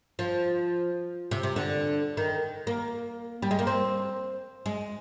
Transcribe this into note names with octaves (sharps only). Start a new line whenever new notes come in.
F3
C3
C3
D3
D#3
A#3
G3
G#3
A#3
C4
G#3